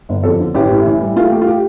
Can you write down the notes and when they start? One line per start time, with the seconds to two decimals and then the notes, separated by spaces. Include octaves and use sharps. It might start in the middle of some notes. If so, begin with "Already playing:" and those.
0.09 G1
0.23 F2 A4
0.40 D3
0.55 A1 G4
0.70 A2
0.86 E3
1.01 G3
1.16 A3 F4
1.32 A3 G4
1.41 F4
1.47 G4